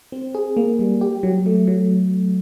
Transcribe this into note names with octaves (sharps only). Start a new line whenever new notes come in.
C4
G#4
A#3
G3
G4
F#3
A3
F#3